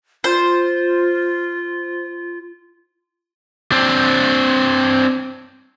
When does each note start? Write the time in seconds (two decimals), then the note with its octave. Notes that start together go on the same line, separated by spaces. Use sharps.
0.24 F4 C5
3.72 C4 D4